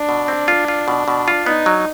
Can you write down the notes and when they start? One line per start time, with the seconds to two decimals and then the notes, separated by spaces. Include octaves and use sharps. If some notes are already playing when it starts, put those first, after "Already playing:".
Already playing: D4
0.09 B2
0.28 C4
0.48 F4
0.68 F4
0.88 B2
1.08 B2
1.28 F4
1.46 B3 D#4
1.66 F#3